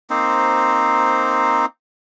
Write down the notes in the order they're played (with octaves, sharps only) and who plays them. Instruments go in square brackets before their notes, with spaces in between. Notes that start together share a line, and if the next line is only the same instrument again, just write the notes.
[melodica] A#3 C4 D#4 C5